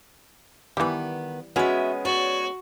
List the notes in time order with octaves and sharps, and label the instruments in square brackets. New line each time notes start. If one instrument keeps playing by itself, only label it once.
[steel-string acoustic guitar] D#3 B3 [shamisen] E3 G3
[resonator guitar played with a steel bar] G#3 B3 C#4 [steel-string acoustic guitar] F#4 E5
[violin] F#4 [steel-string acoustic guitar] C#5 D5